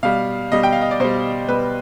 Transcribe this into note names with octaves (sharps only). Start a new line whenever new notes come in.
B2 G3 F5
B2 G3 D#5
G5
F5
D#5
D5
B2 G3 C5
B2 G3 B4